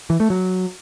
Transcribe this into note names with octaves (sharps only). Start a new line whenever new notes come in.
E3
A3
F#3